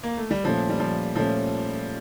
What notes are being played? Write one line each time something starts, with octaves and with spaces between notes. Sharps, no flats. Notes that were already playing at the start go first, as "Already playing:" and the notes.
A#3
A3
G3
A#2 F3 A3 C#4
G3
F3
A#2 F3 A3 C#4